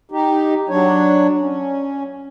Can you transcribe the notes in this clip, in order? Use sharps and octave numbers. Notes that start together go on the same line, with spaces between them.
D#4 G4
F#3 D4 C#5
C#4